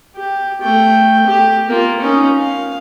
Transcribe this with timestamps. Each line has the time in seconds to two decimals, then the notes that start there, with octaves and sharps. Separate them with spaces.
0.16 G4
0.61 A3 G5
1.27 G4
1.68 A#3 F4
2.01 C#4 D#4
2.38 F5